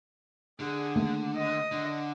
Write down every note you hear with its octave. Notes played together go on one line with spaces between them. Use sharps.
D3 G#4
D#3 A3 A#3
D#5
D3